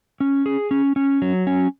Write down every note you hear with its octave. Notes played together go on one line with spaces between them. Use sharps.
C#4
G#4
C#4
C#4
F#3
C#4